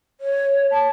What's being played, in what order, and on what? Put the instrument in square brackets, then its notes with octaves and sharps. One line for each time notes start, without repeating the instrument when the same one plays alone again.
[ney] C#5
A5